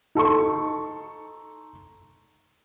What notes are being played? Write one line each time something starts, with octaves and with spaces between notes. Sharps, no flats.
D#4 A4 C6 C#6